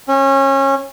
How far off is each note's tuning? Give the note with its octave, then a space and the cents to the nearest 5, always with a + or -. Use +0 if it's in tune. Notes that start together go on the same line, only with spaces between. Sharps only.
C#4 -25